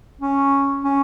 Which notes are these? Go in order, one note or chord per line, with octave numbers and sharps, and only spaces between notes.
C#4
C#4